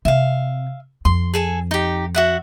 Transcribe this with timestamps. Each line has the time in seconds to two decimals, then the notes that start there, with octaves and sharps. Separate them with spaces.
0.05 C3 E5 F5
1.05 F2 C6
1.34 G#4 A4 G#5
1.71 D#4 G4
2.15 F#4 E5 F#5